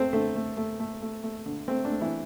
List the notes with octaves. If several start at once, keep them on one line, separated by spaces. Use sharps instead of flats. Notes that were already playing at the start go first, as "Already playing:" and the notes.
Already playing: A3 C4 A4 C5
D3 A3 A4
A3
A3
A3
A3
A3
D3
A3 C4
D4
A3
E3 E4